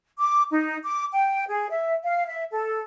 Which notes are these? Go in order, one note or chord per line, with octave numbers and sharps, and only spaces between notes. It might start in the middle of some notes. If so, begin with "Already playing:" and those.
D6
D#4
D6
G5
G#4
E5
F5
E5
A4